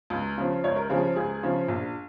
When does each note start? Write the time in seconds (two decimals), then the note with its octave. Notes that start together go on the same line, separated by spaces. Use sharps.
0.10 C#2
0.38 C#3 F3
0.64 C#2 C#5
0.76 A#4
0.89 C#3 F3 G#4
1.16 C#2 G#4
1.43 C#3 F3
1.68 A#1